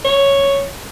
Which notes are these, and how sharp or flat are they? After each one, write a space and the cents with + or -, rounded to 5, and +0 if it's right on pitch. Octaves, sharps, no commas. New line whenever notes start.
C#5 +0